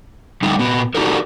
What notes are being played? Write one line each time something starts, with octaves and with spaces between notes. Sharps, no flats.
D3 G3 D#4
A#2 B3
D4 D#4 F#4 G4 A4 A#4